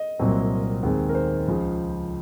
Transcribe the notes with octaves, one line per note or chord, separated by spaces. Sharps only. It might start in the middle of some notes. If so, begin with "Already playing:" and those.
Already playing: D#5
C2 A#2 F#3 C4
D#2 D#3 G#3 C4
A#4
C5
C#2 C#3 F3